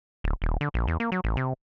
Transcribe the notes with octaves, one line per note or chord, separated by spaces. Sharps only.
D1
D#1
D3
A#1
E2
A#3
F#3
A1
C3